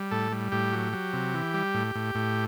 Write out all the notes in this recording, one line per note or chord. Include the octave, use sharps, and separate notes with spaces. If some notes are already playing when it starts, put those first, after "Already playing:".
Already playing: G3
A2 A4
G3
A2 G4
F#3
F#3
C3
E3
G3
A2
A2
A2